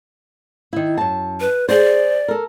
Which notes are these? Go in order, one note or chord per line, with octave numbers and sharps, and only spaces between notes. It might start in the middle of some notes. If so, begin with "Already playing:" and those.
D#3 E4
F#2 A5
B4
G#4 C5 D5
A4 A#4